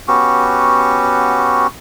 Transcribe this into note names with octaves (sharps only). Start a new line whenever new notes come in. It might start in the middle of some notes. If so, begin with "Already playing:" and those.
B3 C#4 F#4 G4